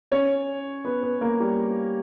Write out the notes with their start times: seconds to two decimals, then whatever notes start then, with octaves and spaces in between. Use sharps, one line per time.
0.11 C#4 C#5
0.85 B3 B4
1.03 B3 B4
1.21 A#3 A#4
1.40 G3 G4